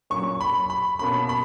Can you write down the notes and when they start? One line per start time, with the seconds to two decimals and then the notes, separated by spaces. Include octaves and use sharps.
0.10 A#2 F#3 C#4 C#6
0.41 B5
0.70 B5
0.99 B2 A#3 C#4 B5
1.29 B5